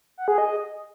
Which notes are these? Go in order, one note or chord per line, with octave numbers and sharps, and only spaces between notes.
F#5
G#4
D#5